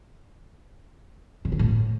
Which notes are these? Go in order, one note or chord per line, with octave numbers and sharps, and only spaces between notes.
C#3
D3
A2